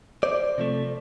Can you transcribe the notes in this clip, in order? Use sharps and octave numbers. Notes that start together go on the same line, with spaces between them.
C5 D5
C3 F3 A3